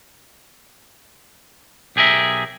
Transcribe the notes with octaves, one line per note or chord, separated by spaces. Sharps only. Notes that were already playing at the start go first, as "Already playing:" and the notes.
B1 G4 G#4 A#4 E5